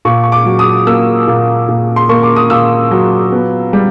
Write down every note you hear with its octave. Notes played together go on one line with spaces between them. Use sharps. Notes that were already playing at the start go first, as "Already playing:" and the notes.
A#2 C#6
C#6
D6
F#3
D#6
A#3 E6
A#2
A#2
C6
A#3 C#6
D6
D#6
A#2 E6
F#3
B3
G3